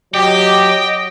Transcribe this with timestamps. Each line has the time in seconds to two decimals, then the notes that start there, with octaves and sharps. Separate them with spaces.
0.14 F#3 G4 D#5 G5